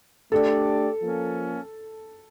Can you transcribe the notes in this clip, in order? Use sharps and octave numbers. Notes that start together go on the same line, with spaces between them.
A3 D4 G4 A4 D5
F3 A#3 C#4